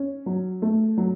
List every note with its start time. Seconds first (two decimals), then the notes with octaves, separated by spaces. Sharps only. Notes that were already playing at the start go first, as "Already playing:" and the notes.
Already playing: C#4
0.26 F#3
0.62 A3
0.98 F#3